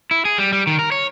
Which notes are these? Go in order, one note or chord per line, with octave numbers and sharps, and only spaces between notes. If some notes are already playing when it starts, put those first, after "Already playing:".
E4
G#4
G3
G3
D#3
A#4
C#5